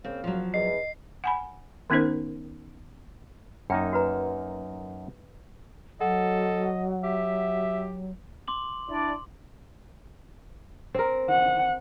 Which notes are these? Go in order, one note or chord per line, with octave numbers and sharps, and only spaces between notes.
C#3 A#3 C4 F5
F3 F#3
E2 D#5 C7
F#5 G#5 B5
D#3 B3 C#4 D#4 A#4 C5
F#2 A#3 D#4 G5 A#5
F#4 B4 A#5
F#3 A4 D#5 F#5
G4 E5
C6 D6 F#7
D4 E4 D5
C4 A#4
F#5